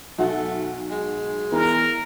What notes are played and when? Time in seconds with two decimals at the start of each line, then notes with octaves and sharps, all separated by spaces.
0.19 B1 A3 F#4 F#5
0.91 G#3
1.52 E2 A#4